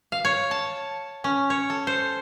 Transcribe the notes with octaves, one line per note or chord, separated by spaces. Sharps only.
F5
C#5
A5
C#4
C#5
A4
C5